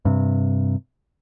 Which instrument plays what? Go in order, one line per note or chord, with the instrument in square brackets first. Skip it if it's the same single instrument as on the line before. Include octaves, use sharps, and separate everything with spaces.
[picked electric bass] G2 C3